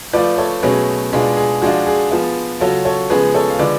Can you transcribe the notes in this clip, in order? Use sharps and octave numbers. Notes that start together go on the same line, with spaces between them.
F3 A3 F4 B4 D5
A4 C#5
B2 F#3 A3 C#4 G#4 B4
B2 G#3 B3 D4 F4 G#4
G#4
F3 G#3 D4 F4 F#4
G#4
F3 B3 F4
C#3 F#3 C#4 F4 F#4 A4
A4 C#5
C#3 F3 G#3 B3 G#4 B4
A4 C#5
F5
D3 F3 G#3 B4 D5